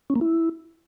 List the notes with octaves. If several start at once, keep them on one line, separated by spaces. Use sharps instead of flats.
C#4
A#3
E4